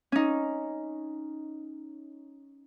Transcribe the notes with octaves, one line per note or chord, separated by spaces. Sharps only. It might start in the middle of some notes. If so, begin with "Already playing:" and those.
C#4 D#4